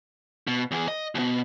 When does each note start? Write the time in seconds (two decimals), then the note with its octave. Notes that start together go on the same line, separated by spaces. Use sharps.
0.47 B2
0.71 E2 G#4
0.88 D#5
1.15 D#2 B2